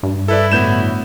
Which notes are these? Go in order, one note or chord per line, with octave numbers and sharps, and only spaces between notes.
G2
E4 A4 B4 D5
A2 D3 B3 F#4 G6 E7